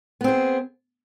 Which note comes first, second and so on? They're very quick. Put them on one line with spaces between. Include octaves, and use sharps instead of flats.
B3 C4 G#4